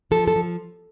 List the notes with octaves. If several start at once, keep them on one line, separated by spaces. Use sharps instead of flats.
F3 A4
A4
F3